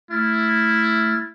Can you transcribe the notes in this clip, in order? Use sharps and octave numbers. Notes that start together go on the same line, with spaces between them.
A3 E4 F6 A6